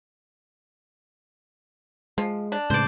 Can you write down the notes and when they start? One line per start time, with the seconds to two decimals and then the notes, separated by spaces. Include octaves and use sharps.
2.18 F3 G#3
2.52 D4
2.70 A2 C#3 G#3 C5 D5